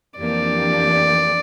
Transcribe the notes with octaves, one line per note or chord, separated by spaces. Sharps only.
F2 E3 A#3 D4 G4 D5